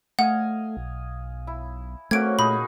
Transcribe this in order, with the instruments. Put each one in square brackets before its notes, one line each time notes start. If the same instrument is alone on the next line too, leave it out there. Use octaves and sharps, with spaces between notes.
[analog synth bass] A3 [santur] D#5 F5 G#5 [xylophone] F#5
[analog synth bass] B1
[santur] E4
[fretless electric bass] A3 [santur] A#3 C#4 F#4 [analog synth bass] C4 [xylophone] G#6 D7
[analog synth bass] A#2 [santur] D#4 G#4 [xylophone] B5